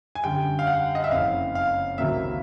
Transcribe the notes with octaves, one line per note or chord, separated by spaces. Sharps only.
G#5
F#2 D3 G3 G5
F5
F#5
D#5
E5
F#1 F2 C#3 F5
F5
C#2 C3 D#3 F#3 A#3 E5